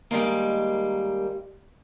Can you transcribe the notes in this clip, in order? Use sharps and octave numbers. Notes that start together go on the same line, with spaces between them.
D#3 G3 G#3 A#3